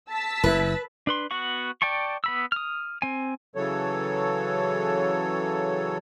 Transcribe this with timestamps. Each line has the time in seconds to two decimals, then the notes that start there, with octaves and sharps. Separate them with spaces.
0.10 A5 E6 B6
0.44 F#1 E4 B4
1.07 D4 B4 C6
1.31 B3 F#4 F#5 C#6
1.82 D5 G5 A5 C#6
2.24 B3 B5 E6
2.52 D#6 F6
3.02 C4 G#5
3.56 C#3 E3 F#3 A4 C#5